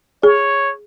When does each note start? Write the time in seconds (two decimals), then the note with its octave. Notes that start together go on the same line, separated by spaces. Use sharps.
0.23 G#4 C#5